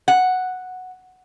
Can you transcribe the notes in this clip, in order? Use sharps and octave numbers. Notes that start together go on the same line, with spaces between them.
F#5